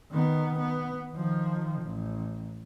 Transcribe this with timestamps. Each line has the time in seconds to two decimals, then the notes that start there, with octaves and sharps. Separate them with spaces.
0.11 D#3 B3
0.59 B3
1.13 D#3 F3
1.82 A1